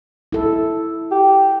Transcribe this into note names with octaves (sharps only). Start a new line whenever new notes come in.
E4 A4
G4